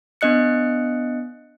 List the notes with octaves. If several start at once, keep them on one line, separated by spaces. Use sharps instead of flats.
B3 D4 D#5 F#6 C#7